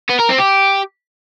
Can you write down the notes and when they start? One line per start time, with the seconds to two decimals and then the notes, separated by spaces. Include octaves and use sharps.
0.10 B3
0.20 A#4
0.30 C4
0.40 G4